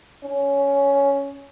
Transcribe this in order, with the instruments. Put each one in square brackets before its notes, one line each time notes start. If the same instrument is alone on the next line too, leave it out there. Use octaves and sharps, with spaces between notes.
[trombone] C#4